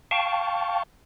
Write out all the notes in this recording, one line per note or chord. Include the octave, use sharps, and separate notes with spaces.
F5 G5 A5 C#6